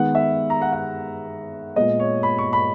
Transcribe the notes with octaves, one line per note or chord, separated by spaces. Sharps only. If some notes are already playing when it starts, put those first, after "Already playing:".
Already playing: D#3 G#3 B3 F#5
E5
A#5
F#5
F#5
A#2 G#3 B3 D#5
C#5
B5
C#6
B5